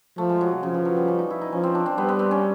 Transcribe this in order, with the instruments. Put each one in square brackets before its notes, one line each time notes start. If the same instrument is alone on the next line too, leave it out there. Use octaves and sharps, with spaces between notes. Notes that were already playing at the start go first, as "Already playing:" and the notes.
[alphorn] F3 [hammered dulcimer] A3
[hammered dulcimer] G#3
F#3
C3
[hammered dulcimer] C#3 [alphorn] F3
[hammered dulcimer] E3
F#3
G3
C#4
D#4
E4
D#4
[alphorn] F3 [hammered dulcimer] C#4
[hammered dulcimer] C4
D4
C4
[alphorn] G3 [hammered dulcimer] B3
[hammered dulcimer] B3
C4
C#4